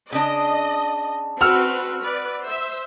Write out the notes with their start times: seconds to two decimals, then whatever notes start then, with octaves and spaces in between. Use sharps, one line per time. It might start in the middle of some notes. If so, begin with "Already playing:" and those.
0.12 C#3 D4 D#5
1.41 C4 F#4 B4 F#5 E6 F6
2.00 B4 D5
2.44 C5 E5